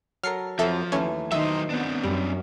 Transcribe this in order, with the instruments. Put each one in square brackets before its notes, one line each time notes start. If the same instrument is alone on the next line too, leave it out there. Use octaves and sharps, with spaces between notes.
[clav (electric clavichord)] F#3 A4 A#4 [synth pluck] F6 C7 C#7
[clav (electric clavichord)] F2 F#3 [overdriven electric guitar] F3 [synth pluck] A4 E5
[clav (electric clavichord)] D#2 E3 A3 [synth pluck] C#4
[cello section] D#3 D#4 C5 [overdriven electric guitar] F#3 D#5 [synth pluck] E5
[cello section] B3 [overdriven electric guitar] C4 D4
[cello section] F#2 [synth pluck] G3